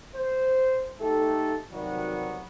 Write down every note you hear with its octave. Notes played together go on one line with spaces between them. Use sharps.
C5
A3 D#4 G4 A4
C3 D#3 F#3 G3 B3 F#4